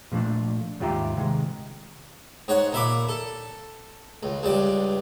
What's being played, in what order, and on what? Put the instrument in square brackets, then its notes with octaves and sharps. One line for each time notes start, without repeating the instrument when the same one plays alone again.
[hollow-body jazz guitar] A#2 F3 A3 D4
D#2 G#2 F4 G4 E5 A#5
C3 D#3 G#3
[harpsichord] G#2 C#5 F#5
A#2 E5 B5 D6
A4
C#2
C#2 G2 D5